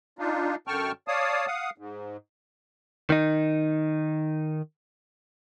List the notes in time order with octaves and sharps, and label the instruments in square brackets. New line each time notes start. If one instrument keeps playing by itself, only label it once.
[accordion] D4 D#4 F4
F#2 D3 G5 A5 C#6 F6
C#5 D5 F5 A5 D#6
F5 F#5 D#6
G#2
[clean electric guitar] D#3 D#4